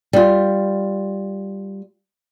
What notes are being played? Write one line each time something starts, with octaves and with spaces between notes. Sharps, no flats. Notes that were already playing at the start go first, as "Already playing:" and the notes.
G3 F4